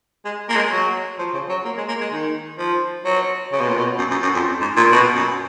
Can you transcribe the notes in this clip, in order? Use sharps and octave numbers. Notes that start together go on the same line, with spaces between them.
G#3
A#3
G#3
F#3
F3
C#3
F#3
A#3
G#3
A#3
G#3
D#3
F3
F#3
C#3
B2
A#2
B2
F#2
F#2
F#2
F2
G#2
A#2
B2
F#2